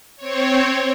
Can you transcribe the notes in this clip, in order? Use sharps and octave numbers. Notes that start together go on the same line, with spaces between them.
C4 C#5